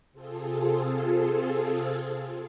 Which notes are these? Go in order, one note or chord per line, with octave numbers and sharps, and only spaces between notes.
C3 C4 F4 G#4 A4